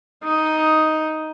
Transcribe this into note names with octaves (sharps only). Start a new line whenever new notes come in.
D#4